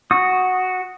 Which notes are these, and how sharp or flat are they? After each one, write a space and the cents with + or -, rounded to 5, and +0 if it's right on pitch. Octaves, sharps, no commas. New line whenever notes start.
F#4 +0 D#6 +0